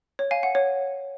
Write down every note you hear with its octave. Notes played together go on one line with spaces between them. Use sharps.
C#5
F5 G#5
F#5
C#5